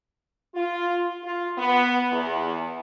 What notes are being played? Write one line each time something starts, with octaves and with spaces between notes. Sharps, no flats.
F4
F4
B3
E2